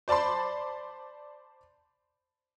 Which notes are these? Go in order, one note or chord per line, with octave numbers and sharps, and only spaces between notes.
C5 D5 A5 B5 C6